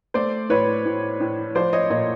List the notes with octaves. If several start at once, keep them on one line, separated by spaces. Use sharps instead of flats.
A3 C5 D5
A2 B4 C#5
A2
A2
F3 C5 D5
C#5 D#5
A#2 C#5 D#5